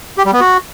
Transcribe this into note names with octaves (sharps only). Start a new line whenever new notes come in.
G4
G3
B3
F#4